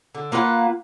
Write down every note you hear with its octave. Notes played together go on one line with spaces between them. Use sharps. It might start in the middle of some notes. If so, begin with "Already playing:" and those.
D3
A#3 F4 B4 F#5